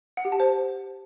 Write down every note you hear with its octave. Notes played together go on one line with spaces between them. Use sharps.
F#5
G4
A5
C5